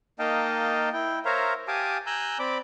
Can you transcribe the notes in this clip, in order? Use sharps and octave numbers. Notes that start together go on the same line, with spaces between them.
A#3 D#4 D#5 F5 G5 A5
E4 G5
A#4 C5 C#5 E5 F5 A#5
G4 F5 G#5 A5 D6 D#6
G#5 A#5 E6 F#6 G6
C4 D5 B5 D6